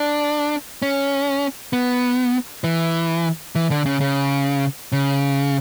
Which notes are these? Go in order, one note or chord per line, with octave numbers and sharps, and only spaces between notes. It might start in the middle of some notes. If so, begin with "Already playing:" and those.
Already playing: D4
C#4
B3
E3
E3
D3
C#3
C#3
C#3